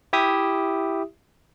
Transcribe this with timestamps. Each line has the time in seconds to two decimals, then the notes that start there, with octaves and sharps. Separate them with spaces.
0.13 E4 G4 E5 D#6